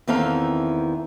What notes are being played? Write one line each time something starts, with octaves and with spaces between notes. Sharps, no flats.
E2 D#3 E3 C4 A4 F5